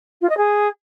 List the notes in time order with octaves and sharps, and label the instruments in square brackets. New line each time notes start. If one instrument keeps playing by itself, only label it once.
[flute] F4
D#5
G#4